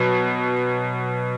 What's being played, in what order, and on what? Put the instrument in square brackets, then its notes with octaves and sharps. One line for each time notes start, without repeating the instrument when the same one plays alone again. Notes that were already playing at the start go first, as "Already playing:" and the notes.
Already playing: [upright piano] B2 F#3